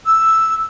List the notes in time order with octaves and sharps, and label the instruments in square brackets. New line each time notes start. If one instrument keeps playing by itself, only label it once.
[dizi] E6